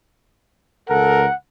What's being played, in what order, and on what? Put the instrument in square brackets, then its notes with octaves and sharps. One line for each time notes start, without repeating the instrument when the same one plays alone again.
[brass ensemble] C#2 A4 A#4 [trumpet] F#5